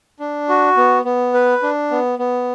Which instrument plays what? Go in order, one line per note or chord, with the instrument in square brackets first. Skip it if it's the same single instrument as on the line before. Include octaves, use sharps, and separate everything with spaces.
[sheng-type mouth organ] D4
F#4
B3
B3
B4
D4
B3
B3